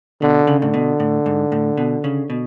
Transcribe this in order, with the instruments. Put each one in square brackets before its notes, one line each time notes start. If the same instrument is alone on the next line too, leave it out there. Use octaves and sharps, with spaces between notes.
[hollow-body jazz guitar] B2 [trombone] D3
[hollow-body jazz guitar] C#3
[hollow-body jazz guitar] A2 [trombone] D3
[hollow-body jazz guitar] B2
A2
G#2
A2
B2
C#3
B2